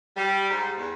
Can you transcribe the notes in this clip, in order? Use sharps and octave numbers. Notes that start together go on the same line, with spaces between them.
G3
G#2
E2